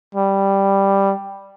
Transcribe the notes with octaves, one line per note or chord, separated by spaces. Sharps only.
G3